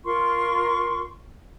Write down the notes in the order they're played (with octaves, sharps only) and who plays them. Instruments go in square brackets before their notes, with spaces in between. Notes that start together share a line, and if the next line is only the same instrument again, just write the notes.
[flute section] F4 A#4 C6 C#6